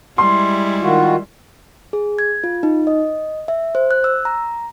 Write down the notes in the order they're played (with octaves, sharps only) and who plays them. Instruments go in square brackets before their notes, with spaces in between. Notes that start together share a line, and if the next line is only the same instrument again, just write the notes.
[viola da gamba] G3 G#3 E4 [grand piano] C6
[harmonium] D#3 F4 F#4
[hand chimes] G#4
G#6
F4
D#4
D#5
E5
C5
F#6
E6
A#5